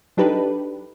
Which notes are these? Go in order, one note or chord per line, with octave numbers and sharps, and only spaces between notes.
F#3 D4 D#4 G4 A4 B4